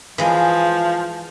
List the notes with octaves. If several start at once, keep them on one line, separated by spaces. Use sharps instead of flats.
E3 F3 G#3 F5